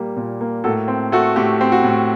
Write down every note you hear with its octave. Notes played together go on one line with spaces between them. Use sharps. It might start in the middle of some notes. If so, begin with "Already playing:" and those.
Already playing: A#2 G3 A#3
A#2
A#3
A2 F#4 A4
C4
A3 F#4 A4
A2 G4
C4
F#4
A2